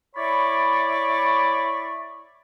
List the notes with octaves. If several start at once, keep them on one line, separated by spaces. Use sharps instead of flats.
E4 C#5 D5 B5 C#6